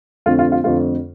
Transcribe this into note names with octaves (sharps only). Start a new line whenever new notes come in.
F2 D3 A3 C4 F4
F4
F4
F2 D3 A3 C4 F4